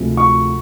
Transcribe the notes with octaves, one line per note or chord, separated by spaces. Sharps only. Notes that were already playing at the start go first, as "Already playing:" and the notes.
Already playing: D2 C3 F3 G#3 C4
C#6